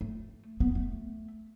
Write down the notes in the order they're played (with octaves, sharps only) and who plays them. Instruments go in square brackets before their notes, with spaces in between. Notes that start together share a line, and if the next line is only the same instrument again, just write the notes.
[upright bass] A3
B3
A3